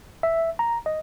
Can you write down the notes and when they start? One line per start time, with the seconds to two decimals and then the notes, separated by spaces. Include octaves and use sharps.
0.23 E5
0.59 A#5
0.86 D#5